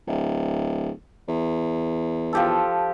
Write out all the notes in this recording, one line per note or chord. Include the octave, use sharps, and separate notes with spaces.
D1
E2
F3 G4 A4